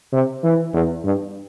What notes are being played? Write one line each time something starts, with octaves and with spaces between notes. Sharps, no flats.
C3
E3
E2
G2